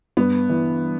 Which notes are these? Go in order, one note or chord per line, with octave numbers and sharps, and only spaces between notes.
G2 B3
E3